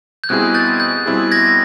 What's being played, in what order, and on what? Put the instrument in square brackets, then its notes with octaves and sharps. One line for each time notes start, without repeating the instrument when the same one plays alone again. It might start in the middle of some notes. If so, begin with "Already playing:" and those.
[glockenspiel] G6
[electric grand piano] B2 G3 C4 E4 G#4 [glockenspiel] F#6 G#6
[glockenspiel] G6 A6
G6
[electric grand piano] B2 G3 C4 E4 G#4
[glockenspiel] G#6 A#6